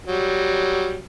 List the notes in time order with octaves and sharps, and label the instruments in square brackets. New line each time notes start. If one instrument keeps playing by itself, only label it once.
[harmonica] F#3 G3